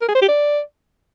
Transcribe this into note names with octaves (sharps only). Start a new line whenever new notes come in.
A#4
G#4
C5
G4
D5